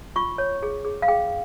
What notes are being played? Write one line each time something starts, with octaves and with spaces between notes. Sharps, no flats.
F4 C#6
C#5
G#4
G#4
F5
G#4 G5